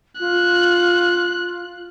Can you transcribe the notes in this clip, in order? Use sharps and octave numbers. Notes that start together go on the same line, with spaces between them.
F4 F#6